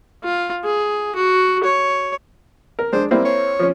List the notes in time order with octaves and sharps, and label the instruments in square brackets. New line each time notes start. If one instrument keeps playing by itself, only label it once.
[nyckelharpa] F4
G#4
F#4
C#5
[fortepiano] A#4
[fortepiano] G#3 D4 [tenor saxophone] C5
[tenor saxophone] G3 [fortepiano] A#3 C4 E4
[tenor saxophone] C#5
[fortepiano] F3 C#4